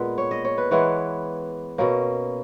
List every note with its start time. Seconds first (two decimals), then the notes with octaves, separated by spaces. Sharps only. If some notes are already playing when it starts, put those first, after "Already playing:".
Already playing: A#2 G#3 B3 B4
0.18 C#5
0.31 D#5
0.45 C#5
0.58 B4
0.71 E3 G#3 B3 C#5
1.78 B2 A#3 C#4